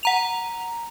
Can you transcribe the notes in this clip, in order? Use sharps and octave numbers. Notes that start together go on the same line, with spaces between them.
F#5 A#5 F7